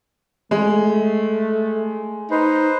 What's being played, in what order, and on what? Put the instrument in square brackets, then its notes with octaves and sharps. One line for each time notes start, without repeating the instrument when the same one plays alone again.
[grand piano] G#3 [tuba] A3
[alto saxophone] D#4 [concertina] B4 C5